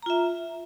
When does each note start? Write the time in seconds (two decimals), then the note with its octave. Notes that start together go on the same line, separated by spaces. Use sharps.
0.03 A#5
0.06 F4
0.10 E5